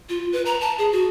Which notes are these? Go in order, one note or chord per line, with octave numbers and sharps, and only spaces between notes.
F4
B4
A#5
A5
G#4
F#4